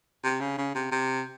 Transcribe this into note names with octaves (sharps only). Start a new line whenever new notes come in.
C3
C#3
C#3
C3
C3